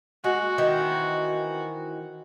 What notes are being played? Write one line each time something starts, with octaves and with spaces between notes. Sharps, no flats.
G#3 F#4
D#3 E3 C4